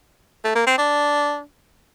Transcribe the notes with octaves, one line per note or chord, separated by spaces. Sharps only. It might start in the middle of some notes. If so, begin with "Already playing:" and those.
A3
A#3
C4
D4